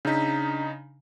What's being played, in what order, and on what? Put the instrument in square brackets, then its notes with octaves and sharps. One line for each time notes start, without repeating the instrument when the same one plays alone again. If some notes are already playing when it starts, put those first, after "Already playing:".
[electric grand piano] C#3 D#4 [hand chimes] D4 A#5 B6